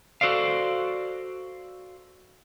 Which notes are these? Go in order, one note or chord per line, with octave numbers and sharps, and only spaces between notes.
F#4 A4 C5 D5 F5